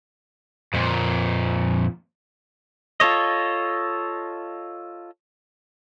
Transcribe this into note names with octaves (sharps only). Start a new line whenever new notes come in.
F2 A#2
F4 A4 C#5 D#5